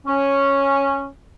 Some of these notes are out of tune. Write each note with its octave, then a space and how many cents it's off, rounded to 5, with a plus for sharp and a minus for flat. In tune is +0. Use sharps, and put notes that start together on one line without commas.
C#4 -5